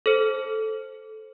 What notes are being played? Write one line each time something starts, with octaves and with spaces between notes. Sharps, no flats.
A4 C5